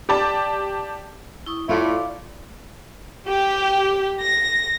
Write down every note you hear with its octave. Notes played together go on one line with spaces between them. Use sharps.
G4 D5 A5 D6
E4 C#6 D#6
A2 A3 E4 F4 D5 F5 D6
G4
A#6